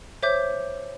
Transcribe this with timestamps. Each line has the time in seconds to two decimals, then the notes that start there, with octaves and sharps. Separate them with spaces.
0.23 C5 C#5 E5 D6 G6